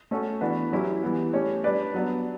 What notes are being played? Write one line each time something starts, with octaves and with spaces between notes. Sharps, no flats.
A3 C#4 F#4 A4
E3 B3 D4 F#4 B4
F#3 C#4 E4 G4
E3 G3 B3
A3 C#4 G4 C#5
G3 D4 G4 B4 D5
F#3 B3 D4